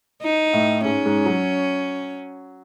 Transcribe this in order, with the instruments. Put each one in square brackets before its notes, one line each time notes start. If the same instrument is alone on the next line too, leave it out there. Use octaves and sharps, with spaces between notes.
[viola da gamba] D#4
[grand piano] A2 A3
[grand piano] G#2 G#3 [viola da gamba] C#4
[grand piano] G#2 G#3
F#3